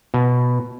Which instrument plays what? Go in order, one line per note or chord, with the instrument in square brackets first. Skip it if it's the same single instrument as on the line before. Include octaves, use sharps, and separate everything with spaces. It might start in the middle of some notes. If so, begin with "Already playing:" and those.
[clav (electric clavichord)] B2